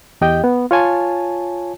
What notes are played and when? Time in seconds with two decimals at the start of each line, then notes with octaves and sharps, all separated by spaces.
0.21 E2 G4 D#5 G5 G6
0.44 B3
0.71 F4 C#5 G#5 A5